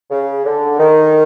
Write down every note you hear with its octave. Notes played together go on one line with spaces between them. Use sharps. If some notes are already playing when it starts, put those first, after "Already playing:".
C#3
D3
D#3